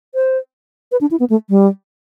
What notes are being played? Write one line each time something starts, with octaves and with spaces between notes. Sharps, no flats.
C5
B4
D4
E4
B3
A3
G3